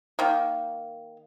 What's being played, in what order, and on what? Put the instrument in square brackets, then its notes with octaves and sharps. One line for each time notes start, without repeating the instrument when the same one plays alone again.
[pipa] D#3 A#3